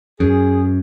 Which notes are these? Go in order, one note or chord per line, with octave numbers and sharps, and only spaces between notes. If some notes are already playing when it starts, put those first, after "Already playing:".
F#2 G#4